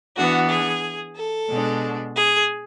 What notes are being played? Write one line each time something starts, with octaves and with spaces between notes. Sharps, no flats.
E3 B3 D4 F#4
G#4
A4
B2 G#3 D4
G#4